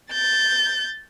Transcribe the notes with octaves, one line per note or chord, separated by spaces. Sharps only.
G6 A6